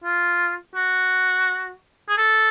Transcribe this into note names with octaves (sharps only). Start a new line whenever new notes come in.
F4
F#4
G#4
A4